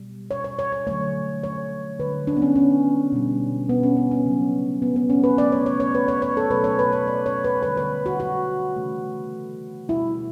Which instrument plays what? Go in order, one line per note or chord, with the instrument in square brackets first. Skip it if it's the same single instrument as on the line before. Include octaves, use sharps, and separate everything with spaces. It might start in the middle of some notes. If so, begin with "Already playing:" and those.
Already playing: [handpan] B2 G3
C#5
C#5
C#5
C#5
D3 F#3 A3 C#5
C#5
D3 G3 B4
D4
B3
C#4
C#4
B2 G3
B3
C#4
C#4
C#4
C#3 F#3 A3
B3
B3
C#4
B4
C#3 F#3 A3 D5
C#5
C#5
C#5
B4
C#5
C#5
A4
B2 F#3 A3 B4
C#5
B4
C#5
D5
C#5
B4
D3 G3 B4
B4
F#4
F#4
C#3 E3 A3
B2 G3 E4